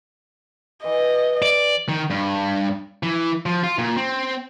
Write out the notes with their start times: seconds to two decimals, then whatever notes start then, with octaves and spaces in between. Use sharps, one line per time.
0.84 E3 D#5
1.42 D5
1.89 D#3
2.10 G2
3.03 E3
3.46 F3
3.64 F4
3.78 A#2
3.96 C4